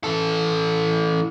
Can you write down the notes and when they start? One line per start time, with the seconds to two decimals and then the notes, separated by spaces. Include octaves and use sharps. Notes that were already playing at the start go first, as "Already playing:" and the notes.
0.04 E3 A4